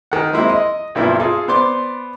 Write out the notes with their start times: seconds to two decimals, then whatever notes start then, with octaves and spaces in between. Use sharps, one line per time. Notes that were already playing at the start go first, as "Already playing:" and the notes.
0.12 D#3 F#5
0.33 G#3 A#3 C4 E4
0.49 D#5
0.95 B1 G2 F3 A#3 D4 E4
1.20 F4 G#4 A4
1.48 B3 C5 D5 C6 D6